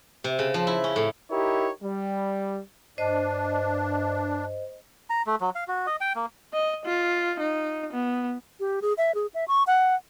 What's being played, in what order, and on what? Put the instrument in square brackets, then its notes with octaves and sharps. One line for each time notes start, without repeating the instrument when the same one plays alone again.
[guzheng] C3
C#3
F3
E4
C#4
A2
[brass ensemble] D#4 E4 G4 A#4 C#5
G3
[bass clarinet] G2 [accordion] D4 [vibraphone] C5 D#5
[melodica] A#5
A3
F#3
F5
F#4
D#5
G5
A#3
[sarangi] D#5
F4
D#4
B3
[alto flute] G4
G#4
E5
G#4
E5
C#6
F#5